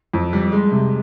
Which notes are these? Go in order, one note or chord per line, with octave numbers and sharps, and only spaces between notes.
F2
G3
G#3
C3